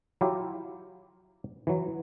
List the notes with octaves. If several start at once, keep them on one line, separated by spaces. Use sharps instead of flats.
F#3 E4 F4 G4
E3 F#3